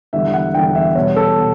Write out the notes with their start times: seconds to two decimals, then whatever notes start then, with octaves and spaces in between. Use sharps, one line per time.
0.13 E1 E2 D3 G3 E5
0.34 F#5
0.54 E1 E2 D3 G3 G5
0.75 E5
0.95 E2 B2 G3 C#5
1.16 A4
1.39 B2